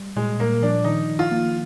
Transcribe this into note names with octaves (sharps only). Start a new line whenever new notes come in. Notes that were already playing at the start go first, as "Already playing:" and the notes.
Already playing: G3
A#2 G#3
A#2 A#3
F3 D4
D#3 D#4
D#3
F4
A#3